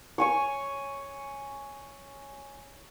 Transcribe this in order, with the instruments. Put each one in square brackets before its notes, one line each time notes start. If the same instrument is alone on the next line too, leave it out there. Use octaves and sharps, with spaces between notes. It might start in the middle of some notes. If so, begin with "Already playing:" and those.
[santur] C#5 G#5 C#6